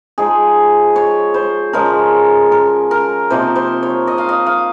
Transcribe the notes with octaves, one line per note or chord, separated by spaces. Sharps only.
F3 G#3 D#4 G#4
C#5
C5
C#3 F3 G#3 C#4 A#4
A#4
A#4
C3 F3 A#3 D#4 C5
C5
C#5
D#5
F5
D#5
F5